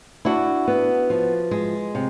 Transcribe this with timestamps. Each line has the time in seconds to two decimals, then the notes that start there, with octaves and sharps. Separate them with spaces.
0.25 D4 E4 F#4
0.68 B3
1.10 F3
1.51 G#3
1.95 C3